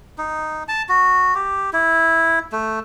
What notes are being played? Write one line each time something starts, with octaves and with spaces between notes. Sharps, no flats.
D#4
A5
F#4
G4
E4
A3